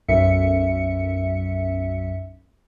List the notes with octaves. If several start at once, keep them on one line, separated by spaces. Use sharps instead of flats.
B1 F#2 E5 C#7